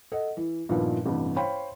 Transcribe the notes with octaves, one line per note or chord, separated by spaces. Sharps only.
A4 D#5 F#5
E3
G2 A#2 D#3 F3 B3 E4
A1 G2 C3
C5 C#5 F5 G5 B5 C6